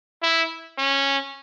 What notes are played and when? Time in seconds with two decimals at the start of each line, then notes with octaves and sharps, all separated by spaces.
0.23 E4
0.78 C#4